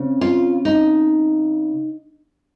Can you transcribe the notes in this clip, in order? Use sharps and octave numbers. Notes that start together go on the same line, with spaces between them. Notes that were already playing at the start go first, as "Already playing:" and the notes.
Already playing: C#3 C4
F4
D#4